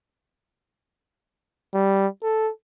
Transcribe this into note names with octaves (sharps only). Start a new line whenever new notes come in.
G3
A4